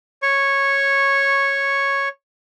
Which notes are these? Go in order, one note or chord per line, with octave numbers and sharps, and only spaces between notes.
C#5 C#6